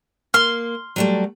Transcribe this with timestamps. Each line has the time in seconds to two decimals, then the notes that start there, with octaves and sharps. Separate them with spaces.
0.34 A#3 C6 F6
0.96 F#3 G3 A3